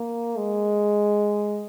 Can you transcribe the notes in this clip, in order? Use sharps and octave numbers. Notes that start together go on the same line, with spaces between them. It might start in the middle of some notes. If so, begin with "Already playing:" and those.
Already playing: A#3
G#3